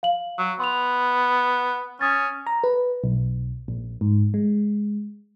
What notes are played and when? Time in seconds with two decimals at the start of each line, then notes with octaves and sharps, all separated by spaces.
0.03 F5 F#7
0.38 F#3
0.60 B3 C6 F7
2.01 C#4 D#6 G#6 A6
2.47 A#5
2.64 B4
3.04 B1
3.68 A#1
4.01 G#2
4.34 G#3